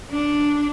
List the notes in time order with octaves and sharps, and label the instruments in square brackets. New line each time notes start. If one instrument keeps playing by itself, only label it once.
[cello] D4